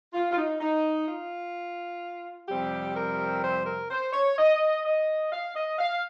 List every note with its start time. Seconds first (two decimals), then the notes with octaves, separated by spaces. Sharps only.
0.13 F4
0.31 F4
0.36 D#4
0.60 D#4
1.07 F4
2.48 F2 C3 G3 C4 G4
2.96 A#4
3.43 C5
3.66 A#4
3.90 C5
4.13 C#5
4.37 D#5
4.85 D#5
5.32 F5
5.55 D#5
5.78 F5